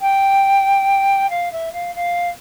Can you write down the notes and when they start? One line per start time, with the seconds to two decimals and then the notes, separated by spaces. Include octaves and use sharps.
0.01 G5
1.29 F5
1.52 E5
1.72 F5
1.95 F5